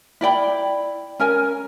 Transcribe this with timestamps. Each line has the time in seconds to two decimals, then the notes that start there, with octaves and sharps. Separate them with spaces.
0.21 E4 D5 G5 B5
1.20 C#4 A#4 G#5